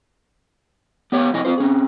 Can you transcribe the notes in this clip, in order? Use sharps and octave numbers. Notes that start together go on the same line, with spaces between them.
B3 G4 C#5 G5
F2 C3 E4 D#5 G#5
C4 C#4 F4 C5
C4 C#4 G#4